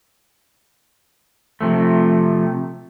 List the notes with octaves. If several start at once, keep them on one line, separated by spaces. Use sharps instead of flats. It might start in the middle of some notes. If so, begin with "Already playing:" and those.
C3 F3 A3